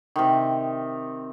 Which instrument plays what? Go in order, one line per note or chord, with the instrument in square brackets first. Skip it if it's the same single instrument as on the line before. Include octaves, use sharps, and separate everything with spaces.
[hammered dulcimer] C3 D#3